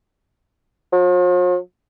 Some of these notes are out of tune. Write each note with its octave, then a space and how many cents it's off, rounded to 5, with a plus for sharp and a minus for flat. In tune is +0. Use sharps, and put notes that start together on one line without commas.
F3 +45